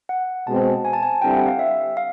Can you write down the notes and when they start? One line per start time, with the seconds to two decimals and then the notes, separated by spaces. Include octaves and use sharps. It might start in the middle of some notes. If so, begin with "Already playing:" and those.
0.09 F#5
0.47 B2 G#3 C4 A5
0.85 G#5
0.93 A5
1.03 G#5
1.22 D3 G3 C4 E4 G5
1.34 F#5
1.47 F5
1.59 E5
1.97 F5